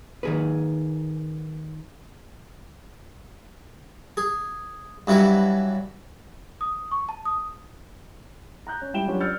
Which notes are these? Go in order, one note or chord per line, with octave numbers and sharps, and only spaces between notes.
D#3 G#4 B4
G#4
G2 E3 F#3 E4 B4
D#6
C#6
A5
D#6
A#5 F#6 G6
C#4
G3 E4 G5 D7 E7 G7
F#3 C#4 D4 F4 G4 B4
D5 E6 F6 G6 A6 C#7